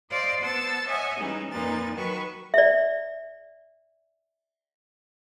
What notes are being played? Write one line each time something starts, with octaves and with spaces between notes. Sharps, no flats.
C5 D5 D#5 F5 C6 D6
B3 C5 F#5 A5 E6 A6
C#5 D#5 E5 F#5 G#5 D#6
E3 G3 G#3 C#4 D#4
F2 A#2 A#3 D#4 B4 A6
D#3 F#3 F#4 B4 B5 C#6
D5 E5